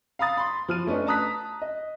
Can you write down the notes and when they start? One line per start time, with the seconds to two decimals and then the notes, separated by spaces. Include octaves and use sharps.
0.19 F5 A#5 B5 D#6 A6
0.37 B5 C6
0.68 F3 F6 D#7
0.87 A3 C#4 D4 B4 D#5
1.07 A5 A#5 D#6 F#6 B6
1.62 D#5